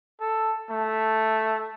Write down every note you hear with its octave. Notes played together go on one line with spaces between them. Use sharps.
A4
A3